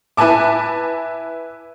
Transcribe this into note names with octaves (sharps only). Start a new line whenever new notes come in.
E4 B4 G#5 A5 D6